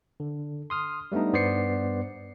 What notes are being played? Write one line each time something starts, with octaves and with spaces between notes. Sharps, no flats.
D3
C6 D#6 F6
G3 A3 B3 D4 D#4
G2 B3 C5 D5 C7 C#7